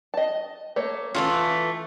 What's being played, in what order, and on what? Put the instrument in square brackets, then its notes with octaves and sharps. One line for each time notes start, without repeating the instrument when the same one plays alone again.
[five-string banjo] D#5 A5
A3 A#3 C#5
[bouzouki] E3 A3 F4 [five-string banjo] C#4